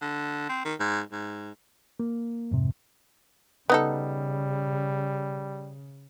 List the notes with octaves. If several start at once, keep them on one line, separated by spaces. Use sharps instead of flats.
D3
C4
D#3
G#2
G#2
A#3
F2 G#2 C3
C#3 G3 B3 D#4 A4